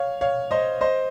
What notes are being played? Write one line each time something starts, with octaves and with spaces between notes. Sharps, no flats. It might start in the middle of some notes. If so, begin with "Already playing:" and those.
Already playing: C#5 F5
C#5 F5
C5 D#5
C5 D#5